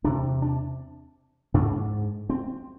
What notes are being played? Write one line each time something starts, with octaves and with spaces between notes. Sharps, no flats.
E2 C3 D4
D4
G#2 D4
C4